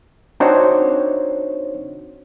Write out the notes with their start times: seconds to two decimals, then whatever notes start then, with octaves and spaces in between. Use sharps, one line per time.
0.40 C4 D4 D#4 F#4 C5 C#5